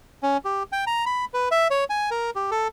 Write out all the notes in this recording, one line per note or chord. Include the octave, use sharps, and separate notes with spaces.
C#4
G4
G5
A#5
B5
B4
E5
C#5
G#5
A#4
G4
A4